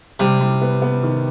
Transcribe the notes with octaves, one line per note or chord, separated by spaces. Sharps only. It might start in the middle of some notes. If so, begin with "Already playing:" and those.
C3 G3
G3
B3
B3
D#3